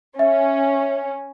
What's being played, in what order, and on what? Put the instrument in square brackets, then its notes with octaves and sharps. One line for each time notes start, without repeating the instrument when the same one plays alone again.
[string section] C#4 [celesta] E5